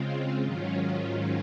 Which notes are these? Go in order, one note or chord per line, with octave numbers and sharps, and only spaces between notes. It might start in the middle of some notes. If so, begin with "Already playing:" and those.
Already playing: C#3 G#3 C4 F4
G#2 D#3 F#3 C#4 F4